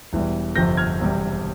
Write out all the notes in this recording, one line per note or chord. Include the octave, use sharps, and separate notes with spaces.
E1 E2 E3 G3
G1 F2 C3 F3 G6 A#6
F6 G#6
E1 E2 C3 G3